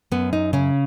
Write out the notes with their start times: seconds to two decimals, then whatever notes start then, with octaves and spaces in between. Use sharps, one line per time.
0.12 F#2 B3
0.33 D#4
0.53 C#3 C#4